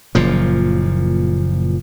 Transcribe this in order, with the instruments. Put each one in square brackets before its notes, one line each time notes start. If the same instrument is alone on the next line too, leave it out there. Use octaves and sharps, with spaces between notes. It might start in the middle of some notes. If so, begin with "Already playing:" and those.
[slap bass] F#1 A#2 F3